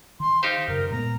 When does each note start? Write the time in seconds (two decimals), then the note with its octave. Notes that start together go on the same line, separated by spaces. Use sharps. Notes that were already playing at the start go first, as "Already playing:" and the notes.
0.20 D#3 C6
0.43 D#4 G4 C5 F5
0.68 F#2 C#3 A#4
0.90 A#2 G#3 B3 A#5